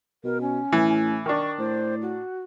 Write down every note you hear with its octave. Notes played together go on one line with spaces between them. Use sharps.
B2 A#4
C#4
A2 E3
D#3 D4 C#6
A2 C5
F#4